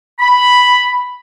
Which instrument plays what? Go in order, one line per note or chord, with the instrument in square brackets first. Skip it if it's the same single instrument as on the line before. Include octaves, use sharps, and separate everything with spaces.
[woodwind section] B5